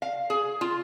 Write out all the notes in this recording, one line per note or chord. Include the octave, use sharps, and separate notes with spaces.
F5
G#4
F4